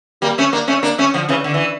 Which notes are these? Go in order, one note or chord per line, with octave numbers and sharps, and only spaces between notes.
G3 A#3
A3 C#4
A#3 D4
A3 C#4
A#3 D4
A3 C#4
D3 F3
C#3 E3
D3
E3